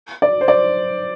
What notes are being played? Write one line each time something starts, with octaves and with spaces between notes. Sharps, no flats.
D5
C5
D5